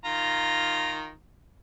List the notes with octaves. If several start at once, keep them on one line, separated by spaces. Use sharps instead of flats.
D#3 F4 A#5